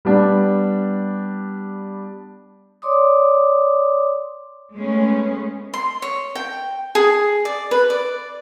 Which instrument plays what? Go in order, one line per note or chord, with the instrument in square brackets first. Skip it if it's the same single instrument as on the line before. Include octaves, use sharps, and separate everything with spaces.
[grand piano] G3 B3 D4
[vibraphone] C#5 D5 C6 D6 D#6
[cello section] G#3 A3 B3 C#4
[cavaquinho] C6
C#5
G5
G#4
D5
B4
D5